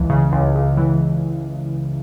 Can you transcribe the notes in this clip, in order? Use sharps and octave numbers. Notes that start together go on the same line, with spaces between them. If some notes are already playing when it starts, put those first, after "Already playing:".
Already playing: C#2 E3
C#3
C#2
C#2
E3